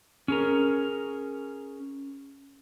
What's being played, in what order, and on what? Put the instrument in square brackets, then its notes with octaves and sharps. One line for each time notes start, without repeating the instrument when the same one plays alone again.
[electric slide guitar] C#4 G#4 A#4